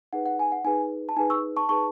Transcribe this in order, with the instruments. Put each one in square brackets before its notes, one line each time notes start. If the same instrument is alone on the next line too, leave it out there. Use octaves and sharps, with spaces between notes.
[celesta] D#4 G#4 B4 F#5
F#5
G#5
F#5
D#4 G#4 B4 G#5
A5
D#4 G#4 B4 G#5
C#6 E6
A5 C#6
D#4 G#4 B4 A5 C#6